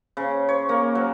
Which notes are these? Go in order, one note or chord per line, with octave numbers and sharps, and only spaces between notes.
C#3
C#5
A#3
F#3